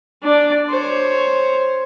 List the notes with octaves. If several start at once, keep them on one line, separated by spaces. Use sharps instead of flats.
D4 D5
C5 C#5